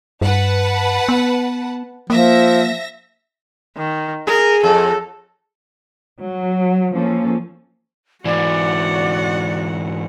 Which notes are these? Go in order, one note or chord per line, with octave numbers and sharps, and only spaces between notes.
G2 B4 F#5 A5
B3
F3 A#3 E5 A#6
D#3
G#4 A#4
F2 A4
F#3
F3 A#3 C#4 A4
G#2 E3 F#4 D5 F#5